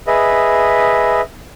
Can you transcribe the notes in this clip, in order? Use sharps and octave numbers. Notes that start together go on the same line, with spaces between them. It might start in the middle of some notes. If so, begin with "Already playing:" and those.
G#4 B4 D#5 E5